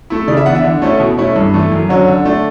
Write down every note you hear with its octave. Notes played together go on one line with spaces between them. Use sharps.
A3 E4
C#3 D5
E5
E3 B3 D4 F#5
E5
D3
A3 C#4 E4
B2
A3 C#4 E4
G2
E3 A3
F#2
D3 F#3 C#4
D3
A3 D4